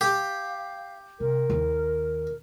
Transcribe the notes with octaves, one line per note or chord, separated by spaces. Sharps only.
G4 F5
C3 A#4
D#2